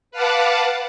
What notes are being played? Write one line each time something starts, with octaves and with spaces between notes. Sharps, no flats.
B4 F5 F#5 A5 D6